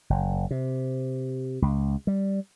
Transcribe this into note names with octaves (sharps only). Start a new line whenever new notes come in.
F#1
C3
C#2
G3